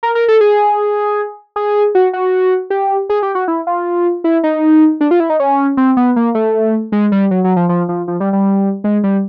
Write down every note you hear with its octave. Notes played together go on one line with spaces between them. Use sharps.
A#4
A#4
A4
G#4
G#4
F#4
F#4
G4
G#4
G4
F#4
E4
F4
E4
D#4
D4
F4
E4
D#4
C#4
C4
B3
A#3
A3
G#3
G3
F#3
F#3
F3
F3
F3
F3
G3
G3
G#3
G3